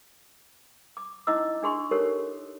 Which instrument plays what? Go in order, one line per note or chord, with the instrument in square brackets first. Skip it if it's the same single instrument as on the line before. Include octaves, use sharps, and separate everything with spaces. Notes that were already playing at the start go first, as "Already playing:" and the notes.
[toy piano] D6
C#4 D#4 E4 D#5 D6 E6
D4 G#4 C6 C#6
D#4 G4 A4 A#4 C5 C#5